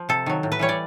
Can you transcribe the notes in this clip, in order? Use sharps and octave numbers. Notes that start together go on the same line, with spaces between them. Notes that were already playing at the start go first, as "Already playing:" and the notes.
Already playing: F3
C3 A4
D#3 F#3
A2
B4
E3 G3 C#5
D5